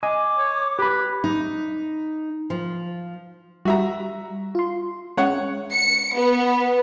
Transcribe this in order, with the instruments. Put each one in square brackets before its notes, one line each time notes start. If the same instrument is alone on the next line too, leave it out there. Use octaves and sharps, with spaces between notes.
[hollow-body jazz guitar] D#5 G#5 [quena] D6
[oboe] C#5
[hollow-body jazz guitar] G4 B5 [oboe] B4
[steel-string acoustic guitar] D#4
F3
[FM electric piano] G3 [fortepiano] F#4 E5 A#5
[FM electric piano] F4 C6
[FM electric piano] G#3 C#4 [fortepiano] C#5 F#5
[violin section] C#7
B3